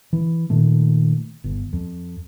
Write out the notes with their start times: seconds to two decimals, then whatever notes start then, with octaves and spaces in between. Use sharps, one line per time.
0.13 E3
0.50 A#2 D#3 A3
1.44 G1
1.73 F2